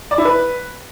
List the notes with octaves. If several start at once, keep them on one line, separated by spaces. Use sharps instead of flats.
D5
E4
B4